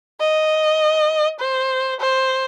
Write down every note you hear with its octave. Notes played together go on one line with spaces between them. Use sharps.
D#5
C5
C5